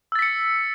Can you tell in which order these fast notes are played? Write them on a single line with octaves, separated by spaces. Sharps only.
E6 A6 B6 C#7